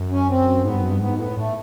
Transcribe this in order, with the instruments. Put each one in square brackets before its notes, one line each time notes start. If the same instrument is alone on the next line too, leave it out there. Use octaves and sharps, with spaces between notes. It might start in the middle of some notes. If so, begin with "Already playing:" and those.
Already playing: [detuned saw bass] F#2
[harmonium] C#4
C4
[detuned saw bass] G#2 [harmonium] B3
[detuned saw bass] G2
F#2
G2
[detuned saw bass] G#2 [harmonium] B3
[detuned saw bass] A2 [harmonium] B3
[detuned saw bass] A2 [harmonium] A3